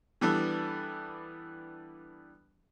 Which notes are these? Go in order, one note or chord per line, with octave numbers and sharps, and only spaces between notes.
E3 G3 B3 D4 A4